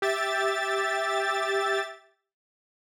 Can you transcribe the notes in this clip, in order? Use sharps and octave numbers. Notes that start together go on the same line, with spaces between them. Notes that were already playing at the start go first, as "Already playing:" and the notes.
G4 E5 A6